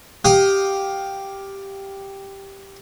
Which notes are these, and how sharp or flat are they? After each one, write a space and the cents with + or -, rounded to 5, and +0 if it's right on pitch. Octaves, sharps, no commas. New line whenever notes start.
G4 +0 F5 +15 D#6 +0